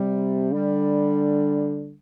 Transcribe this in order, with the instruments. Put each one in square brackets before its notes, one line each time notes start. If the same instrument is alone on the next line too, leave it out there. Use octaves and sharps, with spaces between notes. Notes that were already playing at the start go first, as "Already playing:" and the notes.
Already playing: [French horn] C3 [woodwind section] G3
[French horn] D3 [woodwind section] G3